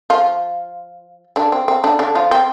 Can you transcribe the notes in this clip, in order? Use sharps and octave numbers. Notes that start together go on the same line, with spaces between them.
F3 F4
D3 D4
C4
C4
D3 D4
D3 D4
F3 F4
C4